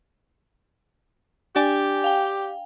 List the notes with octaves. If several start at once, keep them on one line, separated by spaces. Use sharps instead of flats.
D4 G4 D5 G#5
F5 G5